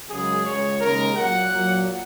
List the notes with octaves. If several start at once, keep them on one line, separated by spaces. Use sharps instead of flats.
F#2 C#3 G#3 G#4
C#2 C#3 G#3 C#5
D#2 C#3 G#3 A#4
A#2 F#3 A#3 F#5
A#2 F#3 A#3